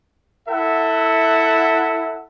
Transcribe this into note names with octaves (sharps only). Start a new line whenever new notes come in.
E4 A4 E5 F#5